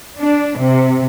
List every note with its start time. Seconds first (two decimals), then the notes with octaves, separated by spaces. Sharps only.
0.18 D4
0.58 C3